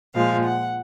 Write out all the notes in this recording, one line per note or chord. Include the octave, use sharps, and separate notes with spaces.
A#2 F3 G#3 F5
F#5